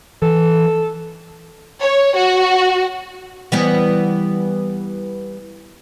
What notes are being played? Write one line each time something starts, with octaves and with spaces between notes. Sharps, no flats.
E3 A4
C#5
F#4
E3 G3 B3